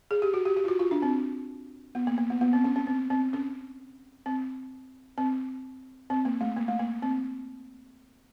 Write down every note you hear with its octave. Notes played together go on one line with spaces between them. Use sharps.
G#4
G4
F#4
G4
G4
F4
F#4
F4
D4
C4
B3
A#3
A#3
B3
B3
C4
C#4
C#4
C4
C4
C#4
C4
C4
C4
A#3
A3
A#3
A3
A#3
C4